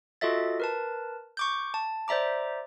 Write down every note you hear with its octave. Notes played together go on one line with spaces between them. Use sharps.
F4 F#4 A4 D#5 E5 A6
A#4 B4 A5
C#6 D6 G6
A5
C5 D5 E5 A#5 D6